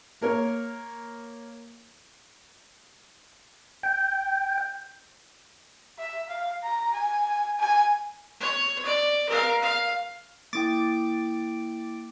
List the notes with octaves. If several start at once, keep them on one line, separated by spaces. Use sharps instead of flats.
A#3 A#4 C#5
G5
E5
F5
A#5
G#5
G#5
C#5
D5
A#4 F5
F5
A#3 E4 G5 D6 A6